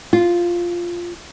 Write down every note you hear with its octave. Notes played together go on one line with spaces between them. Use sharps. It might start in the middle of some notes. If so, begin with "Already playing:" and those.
F4